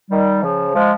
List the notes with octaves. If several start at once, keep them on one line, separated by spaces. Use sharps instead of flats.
D#3 G3
C#3 F3
F3 G#3